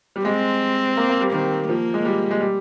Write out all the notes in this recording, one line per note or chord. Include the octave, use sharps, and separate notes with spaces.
G3
G#3 C4
A#3
A#3
G3
D#3 C4
F3 A#3
G#3
G3
G#3
G3